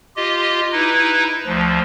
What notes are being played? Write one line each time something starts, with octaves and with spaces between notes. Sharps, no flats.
F4 G4 D#5
D#4 E4 B4
D2 F3